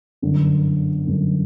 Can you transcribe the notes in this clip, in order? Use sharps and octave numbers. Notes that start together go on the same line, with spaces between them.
G1 F#2 D3
G1 F#2 D3